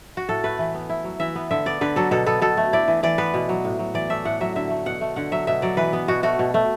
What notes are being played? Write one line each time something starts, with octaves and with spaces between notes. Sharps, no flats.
F#4
A2 A4
A3 B4
E3
B3
E4
F#3
E3 E5
B3
D3 E5
B3 D5
D3 B4
F#3 A4
B2 A4
B3 A4
B2 A4
A3
E4 D5
E3
E3 D5
B3 B4
B2
F#3
A2
F#3
E3 D5
A3 E5
A2 F#5
F#3 E5
D3 E5
A3
B2 F#5
A3
D3 F#5
F#3 E5
B2 E5
F#3 D5
E3 B4
B3
B2 F#4
A3 F#4
B2
A3